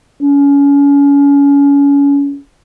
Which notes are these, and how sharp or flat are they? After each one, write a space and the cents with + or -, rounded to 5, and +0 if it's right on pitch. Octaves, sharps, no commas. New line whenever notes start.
C#4 +30